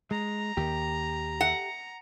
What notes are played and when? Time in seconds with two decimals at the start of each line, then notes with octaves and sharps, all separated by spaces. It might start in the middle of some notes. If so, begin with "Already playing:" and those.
0.11 G#3 A#5
0.57 D#2 D#3 G4
1.41 F#5